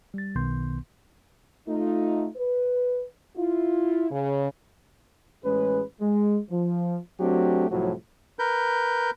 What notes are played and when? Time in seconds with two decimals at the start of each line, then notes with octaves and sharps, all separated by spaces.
0.14 G3 A6
0.35 B1 B2 D#3 B3 C6 G6
1.67 A3 D#4 F4
2.36 B4
3.36 E4 F4
4.11 C#3
5.44 A1 G#3 C#4 G#4 B4
6.01 G#3
6.50 F3
7.20 F#3 A3 C4 D4 F#4 G4
7.70 C2 A2 F3 F#3
8.39 A#4 B4 G6